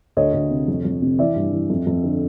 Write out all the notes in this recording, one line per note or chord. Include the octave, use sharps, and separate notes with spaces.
D2 C#5 D#5
D2
C3
F2
F2
C3
E3 D5 E5
G2
E3
F2
F2
D3